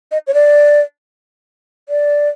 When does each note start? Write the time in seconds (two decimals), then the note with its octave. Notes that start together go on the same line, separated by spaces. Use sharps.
0.11 D#5
0.27 C#5
0.34 D5
1.89 D5